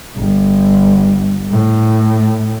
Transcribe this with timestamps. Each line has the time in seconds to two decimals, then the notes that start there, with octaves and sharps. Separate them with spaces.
0.16 G1
1.51 A2